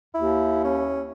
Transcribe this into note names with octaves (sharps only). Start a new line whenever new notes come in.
D#2 E4
C#4